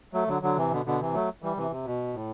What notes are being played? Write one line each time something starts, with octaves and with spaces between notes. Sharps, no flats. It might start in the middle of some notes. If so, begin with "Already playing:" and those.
F#3 A3
D3 F#3
D3 F#3
C3 E3
B2 D3
B2 D3
C3 E3
F#3 A3
E3 G3
C3 E3
C3
B2
A2